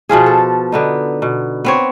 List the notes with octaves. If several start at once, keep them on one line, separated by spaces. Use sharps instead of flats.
B2 F3 F4 G#4
A4
D3 B3 D#4
B2
B3 C4 C#5